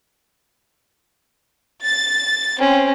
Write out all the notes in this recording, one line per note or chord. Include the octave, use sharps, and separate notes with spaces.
A6
C4 C#4